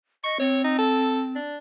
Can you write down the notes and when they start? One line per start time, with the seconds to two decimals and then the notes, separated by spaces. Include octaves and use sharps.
0.24 D#5 C#6
0.40 C4 C#5
0.64 D#4
0.78 A4
1.36 D4